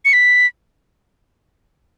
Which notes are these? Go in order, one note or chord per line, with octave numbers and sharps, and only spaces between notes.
C#7
B6